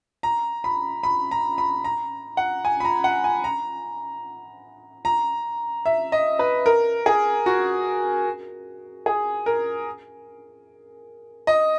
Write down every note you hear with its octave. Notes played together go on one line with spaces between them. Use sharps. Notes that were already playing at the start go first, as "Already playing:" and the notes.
A#5
B5
B5
A#5
B5
A#5
F#5
G#5
B5
A#5
F#5
G#5
A#5
A#5
E5
D#5
B4
A#4
G#4
F#4
G#4
A#4
D#5